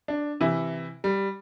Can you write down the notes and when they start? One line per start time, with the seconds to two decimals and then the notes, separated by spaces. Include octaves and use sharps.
0.08 D4
0.40 C3 E3 E4
1.04 G3